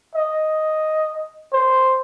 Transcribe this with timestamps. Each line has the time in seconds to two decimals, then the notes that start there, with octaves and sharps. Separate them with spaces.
0.15 D#5
1.53 C5